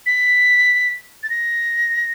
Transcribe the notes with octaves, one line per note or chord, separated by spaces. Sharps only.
B6
A6
A#6